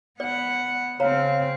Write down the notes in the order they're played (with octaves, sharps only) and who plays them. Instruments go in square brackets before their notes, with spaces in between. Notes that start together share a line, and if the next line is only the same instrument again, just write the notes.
[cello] B3 F#5 [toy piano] D5
[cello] C#3 C4 [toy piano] C#5 A#5 [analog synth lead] F5